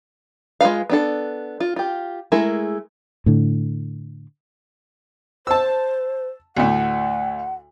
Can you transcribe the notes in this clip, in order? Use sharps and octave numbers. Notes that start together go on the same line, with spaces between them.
G#3 F4 B4 F5
B3 D4 A4
F4
F4 G4
G#3 A3 E4 G#4 A#4
A2 D3
C5 A5 E6
D2 A2 F#5